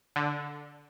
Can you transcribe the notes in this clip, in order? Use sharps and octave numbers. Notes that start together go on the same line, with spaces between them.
D3